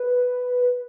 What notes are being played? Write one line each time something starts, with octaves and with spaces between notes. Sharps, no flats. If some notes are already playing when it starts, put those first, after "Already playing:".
Already playing: B4